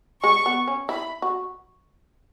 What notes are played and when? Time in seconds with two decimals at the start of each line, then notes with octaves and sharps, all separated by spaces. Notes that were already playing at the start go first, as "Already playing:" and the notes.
0.23 G#3 C#6
0.46 B3
0.68 C#4
0.89 E4 B5
1.22 F#4